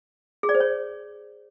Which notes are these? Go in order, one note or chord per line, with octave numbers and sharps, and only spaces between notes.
G#4
D5
C5
C#5